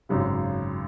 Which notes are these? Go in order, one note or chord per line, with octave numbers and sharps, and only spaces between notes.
G#1 F#2 C#3